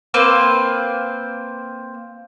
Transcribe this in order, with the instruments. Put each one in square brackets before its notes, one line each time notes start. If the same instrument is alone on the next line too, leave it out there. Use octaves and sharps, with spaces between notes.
[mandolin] A#3 C4 B4 C5